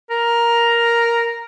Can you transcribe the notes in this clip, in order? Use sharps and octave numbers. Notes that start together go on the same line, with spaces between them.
A#4